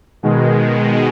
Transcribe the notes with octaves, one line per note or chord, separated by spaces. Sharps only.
B2 D#3 G#3